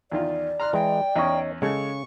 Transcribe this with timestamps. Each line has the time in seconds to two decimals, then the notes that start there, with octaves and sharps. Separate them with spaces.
0.12 E2 D#3 F4 D5
0.60 A#5 C6 F6 F#6
0.73 E3 G#3 G5
1.16 E2 C#4 D#4 C#5 D#5
1.62 C#3 G#3 G#4 A4 C#6